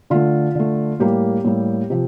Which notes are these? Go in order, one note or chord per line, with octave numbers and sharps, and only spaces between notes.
D3 A3 F4
D3 A3
A2 G3 A#3 G4
A2 G3 A#3
C3 F3